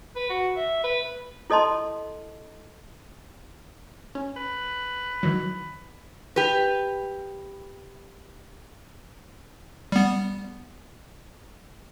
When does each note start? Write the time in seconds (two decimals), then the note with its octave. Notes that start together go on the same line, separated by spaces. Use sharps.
0.16 B4
0.29 F#4
0.56 E5
0.84 B4
1.50 E4 A4 D#5 A5 C6
4.15 C#4
4.36 B4
5.23 D#3 E3 F#3
6.36 G4 B4
9.92 G3 B3